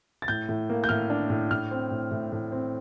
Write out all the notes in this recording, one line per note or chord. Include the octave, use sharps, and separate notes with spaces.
A6
A2 G6
A2
A#3
G6
A2 F6
D4
A2
A2 F6
C4
A2
A2
A2
C4